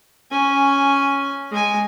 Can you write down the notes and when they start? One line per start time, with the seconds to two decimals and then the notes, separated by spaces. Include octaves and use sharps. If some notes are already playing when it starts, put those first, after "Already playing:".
0.31 C#4 G#5
1.51 G#3 G#5